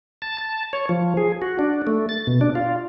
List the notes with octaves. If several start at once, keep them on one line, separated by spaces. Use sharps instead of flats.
A5
A5
C#5
F3
G#4
F#4
D4
A3
A6
B2
D4
F4